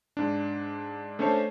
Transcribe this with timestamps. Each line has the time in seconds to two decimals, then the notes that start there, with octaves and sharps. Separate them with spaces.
0.17 G#2 D4
1.19 A3 C#4 D4 C5 C#5 A5